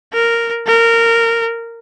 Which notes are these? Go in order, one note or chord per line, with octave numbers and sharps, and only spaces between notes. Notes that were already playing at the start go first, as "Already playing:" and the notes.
A#4
A#4